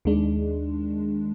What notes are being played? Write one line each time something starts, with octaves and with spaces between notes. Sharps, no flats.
D#2 D#3 G#3 D4